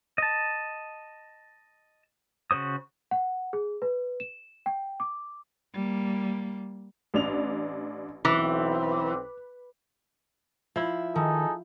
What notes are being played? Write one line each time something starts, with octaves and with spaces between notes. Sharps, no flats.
D#5 A5
C#3 F#4 C5 D#6
F#5
G#4
B4
E7
G5
D6
G3 A#3
A1 D4 F7
B1 E3 C4 D6
F3 E4 E5
D#3 D#4 G#4 A4